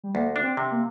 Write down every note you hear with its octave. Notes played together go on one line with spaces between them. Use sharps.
G3
D2 A#3
D4
C4
C3
A#3